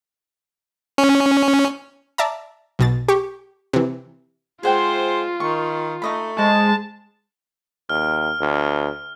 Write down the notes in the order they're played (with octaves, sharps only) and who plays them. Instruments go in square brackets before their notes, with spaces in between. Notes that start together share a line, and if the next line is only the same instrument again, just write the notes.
[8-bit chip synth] C#4
[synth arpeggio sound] D5 E5 A5 A#5
B1 B2 A6
G4 C#6
C3 E3
[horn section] G#3 C5 [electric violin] F4 [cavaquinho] G#4 F#5 G5
[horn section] D#3 [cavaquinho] C#6
[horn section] A3 [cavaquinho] D#4 D#5 B5
[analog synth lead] G#3 [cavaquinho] C5 [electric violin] A5
[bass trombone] D#2 [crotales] F6
[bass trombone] D2